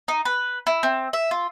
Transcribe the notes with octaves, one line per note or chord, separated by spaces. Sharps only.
D#4
B4
E4
C4
E5
F4